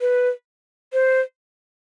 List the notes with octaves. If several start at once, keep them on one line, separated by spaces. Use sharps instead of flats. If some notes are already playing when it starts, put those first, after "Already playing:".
B4
C5